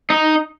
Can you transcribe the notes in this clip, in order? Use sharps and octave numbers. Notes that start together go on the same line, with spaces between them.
D#4